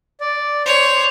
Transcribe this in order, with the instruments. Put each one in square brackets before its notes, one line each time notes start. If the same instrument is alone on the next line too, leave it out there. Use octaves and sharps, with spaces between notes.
[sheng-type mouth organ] D5
[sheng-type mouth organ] C5 [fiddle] C#5